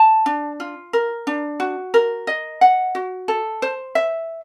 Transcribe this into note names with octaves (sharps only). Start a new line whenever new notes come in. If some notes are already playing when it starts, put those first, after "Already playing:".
Already playing: A5
D4
F4
A#4
D4
F#4
A#4
D#5
F#5
F#4
A4
C5
E5